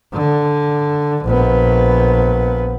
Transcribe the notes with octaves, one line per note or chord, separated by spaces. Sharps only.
D3
A#1 B3